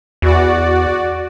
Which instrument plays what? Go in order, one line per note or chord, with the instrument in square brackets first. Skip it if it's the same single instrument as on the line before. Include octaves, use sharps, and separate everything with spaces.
[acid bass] E2 [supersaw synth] F#4 D5